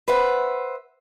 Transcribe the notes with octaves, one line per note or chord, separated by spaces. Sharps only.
B4 C5 E5 F#5